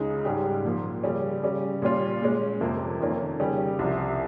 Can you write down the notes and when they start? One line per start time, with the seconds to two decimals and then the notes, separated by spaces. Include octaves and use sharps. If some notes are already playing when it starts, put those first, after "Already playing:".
Already playing: C#2 C#3 G#3 D#4
0.25 G#2 G3 C#4 G4
0.64 A#2 F3 A#3
1.04 C#3 G3 C#4
1.43 C#3 G3 C#4
1.82 A#2 G3 C#4 F4
2.22 A#2 G#3 C#4
2.61 F2 C3 F3 A#3
3.00 F2 D#3 A#3 C#4
3.40 C#3 G3 C#4 G4
3.79 C2 C3 F3